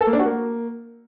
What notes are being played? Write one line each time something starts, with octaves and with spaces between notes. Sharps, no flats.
A4
A#3
D4
F#4
A#3